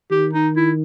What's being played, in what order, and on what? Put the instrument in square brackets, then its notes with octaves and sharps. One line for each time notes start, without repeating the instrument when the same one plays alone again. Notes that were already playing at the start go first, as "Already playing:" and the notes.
[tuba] D#3 [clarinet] G4
[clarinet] D#4
E4